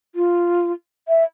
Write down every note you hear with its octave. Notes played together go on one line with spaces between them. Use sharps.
F4
E5